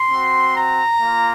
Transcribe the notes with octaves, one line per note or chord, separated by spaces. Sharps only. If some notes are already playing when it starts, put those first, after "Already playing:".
Already playing: C6
C4 F#4
A#5
A#3 F4